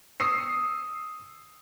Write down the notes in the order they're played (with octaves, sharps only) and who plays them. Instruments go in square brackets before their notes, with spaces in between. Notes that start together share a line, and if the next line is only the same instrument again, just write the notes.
[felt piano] D#6 E6 C7